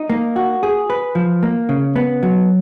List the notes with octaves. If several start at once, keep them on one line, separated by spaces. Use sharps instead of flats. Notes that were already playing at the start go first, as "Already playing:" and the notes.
Already playing: D#4
A#3
F#4
G#4
B4
F3
A#3
C#3
B3
F#3